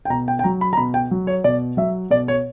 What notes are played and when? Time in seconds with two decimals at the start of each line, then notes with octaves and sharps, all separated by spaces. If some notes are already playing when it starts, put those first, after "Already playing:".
0.05 G5
0.10 B2 A#5
0.28 G5
0.39 G5
0.44 F#3 A#5
0.61 B5
0.73 A#5
0.77 B2 B5
0.94 G5
1.11 F#3
1.27 C#5
1.44 B2 D5
1.77 F#3 E5
2.10 B2 D5
2.28 C#5